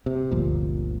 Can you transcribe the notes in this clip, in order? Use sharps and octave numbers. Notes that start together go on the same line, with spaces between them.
C3
G1 D2 A#2 F3